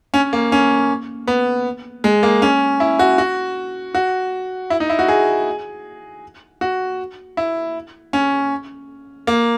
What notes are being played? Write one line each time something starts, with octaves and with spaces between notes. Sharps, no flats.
C#4
A#3
C#4
B3
G#3
A#3
C#4
E4
F#4
F#4
F#4
E4
D#4
E4
F#4
G#4
F#4
E4
C#4
A#3